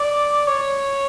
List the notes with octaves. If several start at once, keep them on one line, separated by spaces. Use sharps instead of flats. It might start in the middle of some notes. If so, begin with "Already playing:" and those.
Already playing: D5
C#5